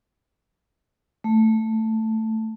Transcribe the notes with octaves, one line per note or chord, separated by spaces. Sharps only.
A3